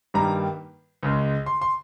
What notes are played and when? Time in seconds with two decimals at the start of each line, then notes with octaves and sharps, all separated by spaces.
0.14 G2 D#3 G3 A#3 A#5
1.03 C#2 C#3 G#3
1.46 C6
1.61 C6